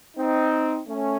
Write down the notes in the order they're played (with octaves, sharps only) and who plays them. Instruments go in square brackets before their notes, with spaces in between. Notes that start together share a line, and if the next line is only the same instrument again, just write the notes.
[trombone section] C4 D#4
A3 C#4